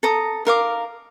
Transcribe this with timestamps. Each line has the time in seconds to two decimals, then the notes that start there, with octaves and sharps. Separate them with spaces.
0.03 A4 A#5 D#6
0.45 D#4 A#4 F5 D6